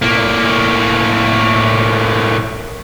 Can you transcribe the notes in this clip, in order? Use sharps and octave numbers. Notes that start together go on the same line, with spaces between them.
A2 A#3